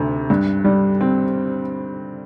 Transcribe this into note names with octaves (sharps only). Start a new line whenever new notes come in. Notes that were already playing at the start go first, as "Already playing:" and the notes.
Already playing: D2 C3
G2
G3
C4